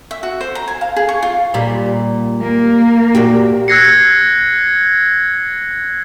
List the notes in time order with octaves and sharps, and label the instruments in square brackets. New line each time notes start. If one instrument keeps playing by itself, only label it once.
[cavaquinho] E5
F#4
C5
A#5
G#5
F5
G#4
C#6
F4
[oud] A#2 G3
[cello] A#3
[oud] A#2 F#4 G4
[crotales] E6 F#6 G#6 A#6 C7 C#7